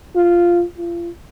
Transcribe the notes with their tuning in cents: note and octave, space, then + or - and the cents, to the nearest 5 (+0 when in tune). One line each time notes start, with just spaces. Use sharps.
F4 -5
F4 -35